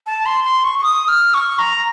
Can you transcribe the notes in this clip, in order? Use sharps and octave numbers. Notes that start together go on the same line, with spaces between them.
A5
C6
C6
C#6
C#6
D#6
F6
C#6
A#5